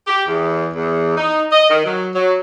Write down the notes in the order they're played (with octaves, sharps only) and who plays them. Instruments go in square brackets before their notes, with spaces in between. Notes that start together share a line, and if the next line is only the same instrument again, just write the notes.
[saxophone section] G4
E2
E2
D#4
D#5
D#3
F#3
F#3